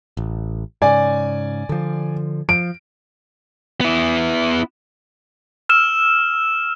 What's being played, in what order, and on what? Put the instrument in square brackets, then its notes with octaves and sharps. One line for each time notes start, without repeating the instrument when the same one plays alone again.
[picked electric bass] A1
[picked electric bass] G#2 C#3 [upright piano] D5 G#5
[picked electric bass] D3 F3
[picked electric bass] F3 [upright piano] D7
[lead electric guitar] B3 E4
[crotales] E6 F6 E7